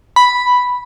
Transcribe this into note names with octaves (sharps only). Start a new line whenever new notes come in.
B5